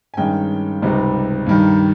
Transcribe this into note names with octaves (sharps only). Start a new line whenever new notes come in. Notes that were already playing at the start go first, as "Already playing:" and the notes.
G#5
G2 D#3 G#3 C#4 D#5 G5
C#2 C3 G3 C4 D#4
G2 D#3 G3